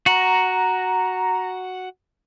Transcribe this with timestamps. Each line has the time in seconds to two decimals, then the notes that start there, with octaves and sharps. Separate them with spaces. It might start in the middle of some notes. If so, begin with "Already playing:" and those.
0.06 F#4 F#5 A#5